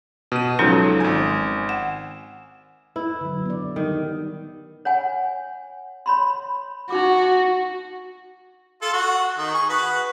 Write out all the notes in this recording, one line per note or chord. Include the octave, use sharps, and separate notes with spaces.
B2 D#7
C#2 F3 F#3 C#4 D#4 A4
G#1 G#5
F#5
E4 B4
D3 F#3
B3 D5
D#3 G3
C#5 F#5 G#5
C#5 B5 C6
D#4 F#4 C#6 D6
F4 A4
F#4
D#3
G#4 C#6
F#4 B4